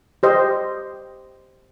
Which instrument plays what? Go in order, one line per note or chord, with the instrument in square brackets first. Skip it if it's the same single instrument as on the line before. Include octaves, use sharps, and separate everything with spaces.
[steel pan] G4 C5 D#5